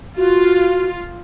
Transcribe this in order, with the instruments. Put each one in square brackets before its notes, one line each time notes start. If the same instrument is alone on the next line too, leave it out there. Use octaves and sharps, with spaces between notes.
[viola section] F4 [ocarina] F#4